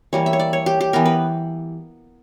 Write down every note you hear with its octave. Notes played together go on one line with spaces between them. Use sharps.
E3 G3 A#3 C#5
E5
C#5
D5
C#5
G4
G4
E3 B3 A#4
B4